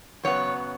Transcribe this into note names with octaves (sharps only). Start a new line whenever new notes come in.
F#2 C#3 F#3 B3 C#5